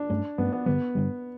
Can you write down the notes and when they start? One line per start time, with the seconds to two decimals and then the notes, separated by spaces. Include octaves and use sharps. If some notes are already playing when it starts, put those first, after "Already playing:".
Already playing: D4
0.10 G2 F#3 A3 C#4
0.38 G2 F#3 A3 B3 C#4
0.52 B3
0.66 G2 D3 G3 B3
0.95 G2 D3 G3